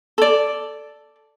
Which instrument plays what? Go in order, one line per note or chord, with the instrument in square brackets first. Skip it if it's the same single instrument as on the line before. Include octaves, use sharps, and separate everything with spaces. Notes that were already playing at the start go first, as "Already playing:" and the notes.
[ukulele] A4 D5